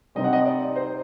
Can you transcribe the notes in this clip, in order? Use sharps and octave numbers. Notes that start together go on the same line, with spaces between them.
C2 C3 G3 C4 D#4 D#5
F#5
D#5
D5
C5